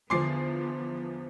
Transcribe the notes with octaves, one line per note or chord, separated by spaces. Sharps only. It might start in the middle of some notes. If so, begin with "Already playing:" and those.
E2 D3 F3 B3 G#5 C6 D6 C7